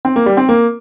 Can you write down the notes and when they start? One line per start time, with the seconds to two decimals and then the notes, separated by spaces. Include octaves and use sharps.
0.05 C4
0.16 A#3
0.26 G3
0.37 C4
0.49 A#3